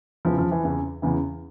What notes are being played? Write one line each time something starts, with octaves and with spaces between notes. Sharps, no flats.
E2 C#3 E3 F3
F3
E3
E2 C#3 E3
E2 C#3 E3